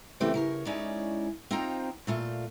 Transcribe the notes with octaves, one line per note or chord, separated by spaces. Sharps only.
D2 C#3 E3 A3 C4 G4
C#3 A#4 C#5
G#3 C#4 D#4 E4 C#5 D5
C4 D#4 F4 C5 G5 A#5
A#2 A3 F4